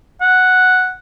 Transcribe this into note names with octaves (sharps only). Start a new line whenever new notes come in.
F#5